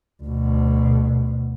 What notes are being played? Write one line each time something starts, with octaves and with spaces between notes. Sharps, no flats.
D2 B2